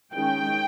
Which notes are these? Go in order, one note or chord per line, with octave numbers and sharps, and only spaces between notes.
D#3 G#3 C#4 G5